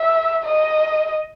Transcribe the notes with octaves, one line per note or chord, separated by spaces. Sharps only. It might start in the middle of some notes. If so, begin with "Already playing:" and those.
Already playing: E5
D#5